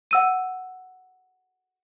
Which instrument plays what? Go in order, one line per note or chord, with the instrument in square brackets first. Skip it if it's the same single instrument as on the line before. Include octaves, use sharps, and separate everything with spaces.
[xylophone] F#5 E6 D#7